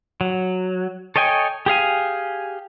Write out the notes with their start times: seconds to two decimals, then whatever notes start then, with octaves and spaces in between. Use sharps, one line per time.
0.21 F#3
1.16 A4 C#5 D#5 G5 G#5
1.66 G4 G#4 F5 G#5